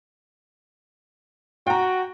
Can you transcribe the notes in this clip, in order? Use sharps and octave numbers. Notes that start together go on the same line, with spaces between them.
F#4 G5 A#5